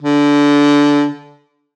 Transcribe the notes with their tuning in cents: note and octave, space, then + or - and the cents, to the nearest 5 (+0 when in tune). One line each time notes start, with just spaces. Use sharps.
D3 -20